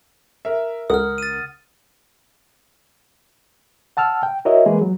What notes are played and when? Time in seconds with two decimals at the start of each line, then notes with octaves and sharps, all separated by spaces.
0.45 A#4 E5
0.90 C#2 A#4 F#5 D#6 F6
1.18 A6 D#7
3.97 F#5 A5 E6 F6
4.23 G5
4.45 E4 F#4 A#4 C#5 D#5 E5
4.66 E3 G#3 A#3 G#4 B4
4.81 F#3